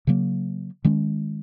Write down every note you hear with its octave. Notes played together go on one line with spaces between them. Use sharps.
C#3 F#3 A#3
D#3 G#3 C#4